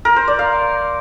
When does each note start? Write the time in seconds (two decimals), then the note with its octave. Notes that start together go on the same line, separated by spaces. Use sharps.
0.05 A#4
0.16 C5
0.28 D5
0.39 F5